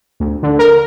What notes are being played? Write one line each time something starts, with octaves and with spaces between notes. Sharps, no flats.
D2
D3
A#4